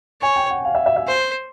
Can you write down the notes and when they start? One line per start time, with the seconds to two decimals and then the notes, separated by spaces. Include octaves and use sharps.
0.22 C#5 G#5
0.36 G5
0.51 F#5
0.65 F5
0.75 E5
0.86 E5
0.96 E5
1.07 C5